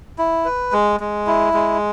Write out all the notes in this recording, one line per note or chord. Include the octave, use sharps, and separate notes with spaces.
E4
B4
G#3
G#3
E4
G#3